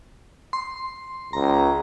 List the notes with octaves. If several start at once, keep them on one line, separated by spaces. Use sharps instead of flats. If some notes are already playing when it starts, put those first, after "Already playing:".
C6
C#2 A#5